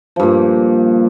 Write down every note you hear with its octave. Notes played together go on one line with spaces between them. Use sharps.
G2 A#2 F3